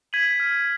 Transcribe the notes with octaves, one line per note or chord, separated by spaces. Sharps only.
G#6 B6 D#7 F#7
F6